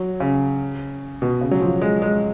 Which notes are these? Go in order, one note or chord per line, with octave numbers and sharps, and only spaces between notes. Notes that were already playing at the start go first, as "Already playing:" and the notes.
Already playing: F#3
C#3
B2
C#3
F#3
F3
G#3
G#3